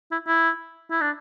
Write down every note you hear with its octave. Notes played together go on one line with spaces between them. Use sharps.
E4
E4
E4
D4